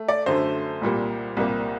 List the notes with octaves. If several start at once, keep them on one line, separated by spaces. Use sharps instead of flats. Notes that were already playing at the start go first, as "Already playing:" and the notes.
Already playing: A3
D5
F#2 D3 A3 C5
C2 A#2 G3 A#3
C2 A#2 G3 A#3